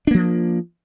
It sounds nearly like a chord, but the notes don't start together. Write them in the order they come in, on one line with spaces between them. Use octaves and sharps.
D4 A#3 F3